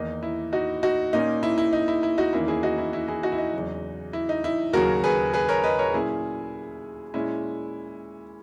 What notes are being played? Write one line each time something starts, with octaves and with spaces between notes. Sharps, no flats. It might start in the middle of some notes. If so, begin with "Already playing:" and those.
Already playing: E2 D#3 A#3 D#4
E4
D#4 F#4
D#4 F#4
A#2 A#3 C#4 D#4
E4
E4
D#4
E4
E4
D#4 F#4
E2 D#3 A#3 C#4 E4
E4 G#4
D#4 F#4
E4
E4
E4 G#4
D#4 F#4
E4
D#4
E2 C#3 F#3
E4
D#4
E4
D#2 C#3 F#3 F#4 A#4
G#4 B4
G#4 B4
A#4 C#5
B4 D#5
A#4 C#5
A#2 F#3 C#4 E4 G#4
A#2 G#3 C#4 E4